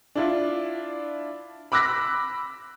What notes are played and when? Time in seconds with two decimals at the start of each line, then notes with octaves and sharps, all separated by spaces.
0.16 D4 E4 F4
1.72 B5 D6 E6 F#6 A#6 B6